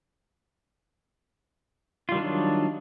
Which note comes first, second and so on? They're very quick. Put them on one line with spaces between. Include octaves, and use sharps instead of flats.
F4 G3 D#3 D4 F#3